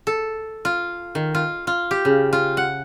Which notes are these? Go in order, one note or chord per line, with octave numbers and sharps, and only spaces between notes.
A4
F4
D#3
F4
F4
G4
C#3
F4
F#5